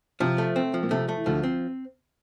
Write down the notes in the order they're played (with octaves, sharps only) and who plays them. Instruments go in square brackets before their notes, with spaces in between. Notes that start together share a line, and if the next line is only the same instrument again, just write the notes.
[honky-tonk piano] C3 [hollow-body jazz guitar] F3
[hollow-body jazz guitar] A3
C4
F3
[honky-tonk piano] A#2
[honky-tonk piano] C3 [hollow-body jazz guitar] A3
[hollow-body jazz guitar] A3
[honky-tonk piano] E3
[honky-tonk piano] D2 D3 [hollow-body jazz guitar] F3
[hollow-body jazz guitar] C4